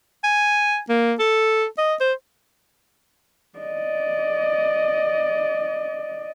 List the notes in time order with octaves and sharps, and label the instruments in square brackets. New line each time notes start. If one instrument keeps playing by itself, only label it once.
[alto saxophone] G#5
A#3
A4
D#5
C5
[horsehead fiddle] D5 D#5